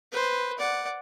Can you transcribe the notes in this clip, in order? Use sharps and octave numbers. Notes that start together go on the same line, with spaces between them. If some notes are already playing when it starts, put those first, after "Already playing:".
B4 C5
D5 F#5